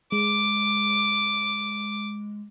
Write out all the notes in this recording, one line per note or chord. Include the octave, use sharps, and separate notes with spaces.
G#3 D6